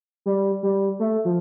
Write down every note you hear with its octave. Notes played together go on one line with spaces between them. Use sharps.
G3
G3
A3
F3